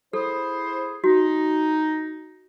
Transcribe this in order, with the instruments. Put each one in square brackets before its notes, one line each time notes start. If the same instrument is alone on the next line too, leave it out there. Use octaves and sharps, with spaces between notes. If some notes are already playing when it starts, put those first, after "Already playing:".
[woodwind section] E4 G#4 C5 [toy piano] A4
[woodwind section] D#4 [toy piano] F#4